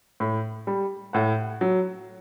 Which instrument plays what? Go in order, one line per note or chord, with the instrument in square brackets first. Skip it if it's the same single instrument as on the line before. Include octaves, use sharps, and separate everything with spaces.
[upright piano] A2
G3
A2 F#5
F#3